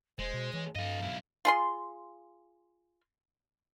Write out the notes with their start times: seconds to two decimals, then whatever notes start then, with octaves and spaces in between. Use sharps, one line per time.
0.19 E1 G#3 C5
0.34 B2
0.54 E3 C#5
0.76 G2 A4 D#5 F5
1.00 B1 E4
1.45 F4 G#4 C6